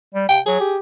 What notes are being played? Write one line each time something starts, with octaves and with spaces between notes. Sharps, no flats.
G3
C3 G5
F#3 G#4
G4